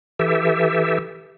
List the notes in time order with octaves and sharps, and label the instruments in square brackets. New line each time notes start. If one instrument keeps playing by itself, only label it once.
[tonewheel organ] E3 G4 A4 E5